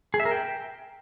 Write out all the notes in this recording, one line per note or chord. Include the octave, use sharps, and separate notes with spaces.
G#4
E5
A#4
G5